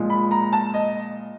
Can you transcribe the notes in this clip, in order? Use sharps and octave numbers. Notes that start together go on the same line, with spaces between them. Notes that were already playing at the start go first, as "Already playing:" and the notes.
Already playing: A#2 F3 G#3
B5
A#5
A5
D#5